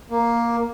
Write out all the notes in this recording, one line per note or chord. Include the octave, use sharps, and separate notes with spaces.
A#3